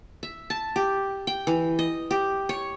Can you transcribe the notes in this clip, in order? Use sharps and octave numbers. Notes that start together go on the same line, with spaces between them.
E5
A5
G4
G5
E3
D#5
G4
C#5